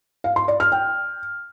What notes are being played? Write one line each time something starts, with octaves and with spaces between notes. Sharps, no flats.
F5
C6
D5
F6
G5